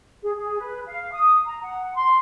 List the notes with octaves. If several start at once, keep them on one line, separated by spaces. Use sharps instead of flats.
G#4
G#4
B4
F5
D#6
A#5
F#5
C6